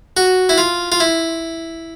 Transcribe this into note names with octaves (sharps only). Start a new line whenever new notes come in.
F#4
E4
F4
F4
E4